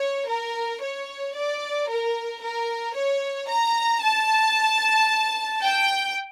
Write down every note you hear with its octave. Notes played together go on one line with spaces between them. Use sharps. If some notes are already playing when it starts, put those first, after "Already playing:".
Already playing: C#5
A#4
C#5
D5
A#4
A#4
C#5
A#5
A5
G5